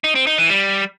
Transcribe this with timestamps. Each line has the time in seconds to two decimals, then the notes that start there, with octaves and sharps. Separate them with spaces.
0.04 D#4
0.15 C4
0.27 D#4
0.38 E3
0.50 G3